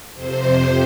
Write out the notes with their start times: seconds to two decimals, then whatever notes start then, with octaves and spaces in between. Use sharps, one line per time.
0.14 F2 C3 C5